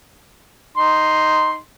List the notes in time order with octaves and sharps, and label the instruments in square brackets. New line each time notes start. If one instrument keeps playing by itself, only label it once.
[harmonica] D#4 C6